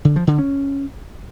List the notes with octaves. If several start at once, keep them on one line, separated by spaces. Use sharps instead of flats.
D3
F3
D3
C#4